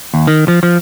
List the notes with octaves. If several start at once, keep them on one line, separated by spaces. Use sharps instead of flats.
D#2
D#3
F3
F3